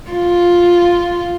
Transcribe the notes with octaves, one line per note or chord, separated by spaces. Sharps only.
F4